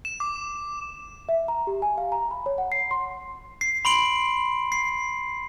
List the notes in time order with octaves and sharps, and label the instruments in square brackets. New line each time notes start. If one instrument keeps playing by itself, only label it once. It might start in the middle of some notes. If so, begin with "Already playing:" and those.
[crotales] E7
D6
[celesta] E5
A#5
G4
G#5
F5
A#5
B5
C#5
F#5
C7
C6
[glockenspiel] C7
B5 C6 D7 F#7
C7